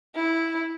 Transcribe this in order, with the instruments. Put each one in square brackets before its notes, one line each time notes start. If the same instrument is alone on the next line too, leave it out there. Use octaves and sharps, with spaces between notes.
[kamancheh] E4